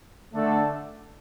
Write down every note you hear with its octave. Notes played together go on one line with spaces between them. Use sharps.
D3 A3 D4 A4